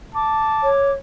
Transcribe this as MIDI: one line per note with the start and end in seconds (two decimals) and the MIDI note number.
0.15 0.69 81
0.15 0.93 86
0.63 0.91 73